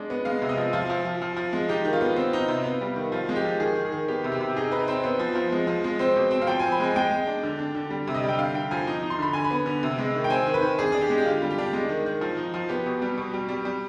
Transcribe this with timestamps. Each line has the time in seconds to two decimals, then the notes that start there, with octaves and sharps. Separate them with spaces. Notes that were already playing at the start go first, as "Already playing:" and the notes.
Already playing: G#3 D4
0.10 B3
0.25 G#3 F5
0.42 C3
0.49 D#5
0.57 F3
0.73 F3 F4
0.90 F3
1.05 F3
1.22 F3
1.36 F3
1.53 G#3
1.69 D#4 G4
1.85 D#3
1.93 F4
2.01 B3
2.16 C4
2.33 D#4
2.48 C3
2.64 B3
2.81 G3
2.96 D#3
3.12 F3 F4
3.29 G#3
3.36 G4
3.44 F3
3.60 D#3 G#4
3.76 D#3
3.85 G#4
3.92 D#3
4.08 B3 G4
4.24 C3
4.32 G4
4.41 C3
4.56 D#4 G#4
4.71 D#4 B4
4.87 C4 C5
5.04 B3
5.19 F3
5.35 F3
5.52 G#3
5.67 F3
5.84 G#3
5.99 C4 C5
6.16 B2
6.31 C4
6.42 F5
6.47 F3 G5
6.60 C4 G#5
6.72 B5
6.80 G#3 G#5
6.96 G#3 G5
7.11 G#3
7.27 D4
7.43 D3
7.59 D4
7.75 D3
7.90 G3
8.08 C3
8.14 D#5
8.23 G3
8.29 G5
8.39 D3 F5
8.54 D3 G5
8.71 F3 G#5
8.87 D#4
9.03 D#4
9.10 C6
9.19 D3 B5
9.33 D3 G#5
9.44 B5
9.51 B3
9.66 D3
9.83 C3
9.98 G#3
10.15 D#3
10.24 G5
10.30 C4 G#5
10.47 D#3
10.54 B4
10.62 D#3
10.78 D4 G#4
10.92 D4 G#4
11.01 G4
11.10 G#3
11.18 G4
11.25 D3 F4
11.42 G3
11.50 G4
11.58 D4
11.73 G#3
11.89 D#3
12.06 D#3
12.21 F3
12.37 D#4
12.54 F3
12.69 B3 G4
12.86 B2
13.02 G3
13.17 B2
13.34 G3
13.49 G3
13.65 G3